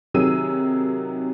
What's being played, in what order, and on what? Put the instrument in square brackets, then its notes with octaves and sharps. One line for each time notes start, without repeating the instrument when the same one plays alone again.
[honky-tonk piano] C3 D#3 F#3 G#4 E6 D#7